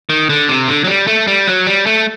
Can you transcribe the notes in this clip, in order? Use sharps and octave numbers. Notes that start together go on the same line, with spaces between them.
D#3
D3
C3
D3
F#3
G3
A3
G3
F#3
G3
A3